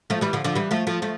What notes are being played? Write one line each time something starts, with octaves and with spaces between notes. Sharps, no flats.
F3 A3
E3 G3
D3 F3
D3 F3
E3 G3
F3 A3
F3 A3
F3 A3